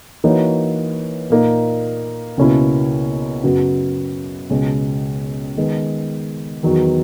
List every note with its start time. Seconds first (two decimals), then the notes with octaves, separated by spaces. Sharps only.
0.24 E3 A#3 D#4 F#4 C#5
1.30 A#2 A#3 D#4
2.37 C#2 B2 A#3 C#4 E4
3.43 F#2 C#3 F#3 B3 F#4
4.50 C#2 B2 G#3 C#4
5.57 D#3 G#3 B3
6.63 E2 D#3 F#3 B3 F#4